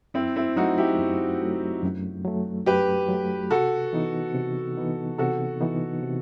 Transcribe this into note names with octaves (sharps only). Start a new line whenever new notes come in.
F#2 C4 E4
C4 E4
F#3 A3 D#4 F#4
E4 G4
F#2
F#3 A3
F#2
F#3 A3
F#2 G4 B4
F#3 A3
C3 F#4 A4
E3 B3 D#4
C3
E3 B3 D#4
C3 F#4 A4
E3 B3 D#4
C3